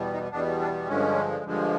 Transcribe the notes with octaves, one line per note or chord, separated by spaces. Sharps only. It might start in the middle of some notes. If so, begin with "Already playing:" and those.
Already playing: E2 B2 G3 B3
D#4
E2 B2 G3 B3 D4
D4
G2 D3 F3 G#3 C#4
G2 D3 F3 G#3